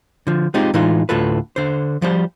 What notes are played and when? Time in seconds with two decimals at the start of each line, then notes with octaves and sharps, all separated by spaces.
0.27 D3 F3
0.54 G#3 C4 D#4 F4 G4
0.74 A2 E3 G#3 D#4 F4
1.09 D2 A2 F4 A4 B4
1.56 D3 C5
2.02 F3 G3 C5